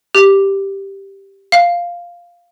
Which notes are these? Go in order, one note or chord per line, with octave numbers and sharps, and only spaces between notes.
G4
F5